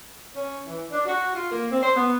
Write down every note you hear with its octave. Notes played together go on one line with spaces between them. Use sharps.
C#4
E3
D4
F#4
F4
A#3
C4
C5
B3